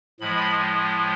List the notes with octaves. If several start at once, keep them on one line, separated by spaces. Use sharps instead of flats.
A2 F3 G#3 B5